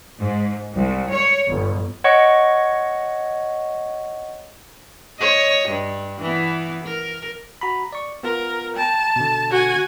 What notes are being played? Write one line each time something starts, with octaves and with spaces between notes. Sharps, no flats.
G#2
C2
C#5
G1
C#5 D#5 F#5 C#6
C#5 D#5
G2
E3 B3 E4
A#4
F#4 A#5 B5
D5 C#6
B3 F4 A#4
G5 A5 A#5
B2 D3
F#4 G#5